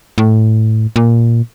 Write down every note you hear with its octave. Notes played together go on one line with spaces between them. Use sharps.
A2
A#2